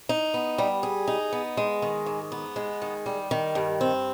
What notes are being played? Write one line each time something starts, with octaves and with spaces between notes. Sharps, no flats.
D#4
B3
G3
G#4
D#4
B3
G#3
D#3
G#2
B3
G#3
D#3
G3
D#3
G2
C4